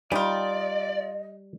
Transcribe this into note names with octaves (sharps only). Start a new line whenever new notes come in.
G3 D#4 F4 D5 D#5